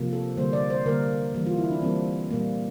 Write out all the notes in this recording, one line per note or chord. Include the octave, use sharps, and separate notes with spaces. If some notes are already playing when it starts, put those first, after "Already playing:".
Already playing: C3 F3 A#3
A4
D3 G3 A#3 C5
D5
C5
D3 G3 A#3 A#4
E3 G3 A#3
F4
E4
D4
E3 G3 A#3 C4
A#2 G3 A#3